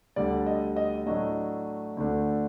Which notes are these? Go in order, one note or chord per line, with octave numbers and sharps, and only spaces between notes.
D2 D3 G3 D5
D#5
D#5
A2 F#3 A3 D4 D#5
D2 D3 A3 D4